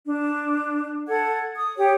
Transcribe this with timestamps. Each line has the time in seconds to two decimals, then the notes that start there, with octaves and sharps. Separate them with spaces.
0.05 D4
1.09 A4 F#5 G#6
1.56 D#6
1.76 G4 C#5